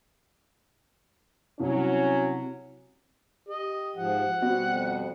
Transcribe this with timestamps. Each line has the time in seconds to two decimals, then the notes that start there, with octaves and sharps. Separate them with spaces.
1.60 C2 F#3 C#4
3.48 G4 D#5
3.96 G#2 F3 F#5
4.42 B2 G3 B3 C4 F#4
4.71 F2